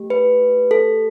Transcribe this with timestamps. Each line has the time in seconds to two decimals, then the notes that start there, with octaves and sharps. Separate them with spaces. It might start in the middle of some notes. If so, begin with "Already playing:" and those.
Already playing: A3 G4
0.10 B4
0.71 A4